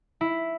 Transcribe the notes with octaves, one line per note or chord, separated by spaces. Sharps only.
E4